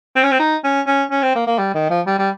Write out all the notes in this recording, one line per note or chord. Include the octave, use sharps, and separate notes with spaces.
C4
C#4
C4
D#4
C#4
C#4
C#4
C4
A#3
A#3
G3
D#3
F3
G3
G3